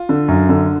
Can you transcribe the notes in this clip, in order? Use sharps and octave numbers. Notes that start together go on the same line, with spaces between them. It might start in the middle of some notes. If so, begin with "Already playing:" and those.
Already playing: F4
D3
F#2
D3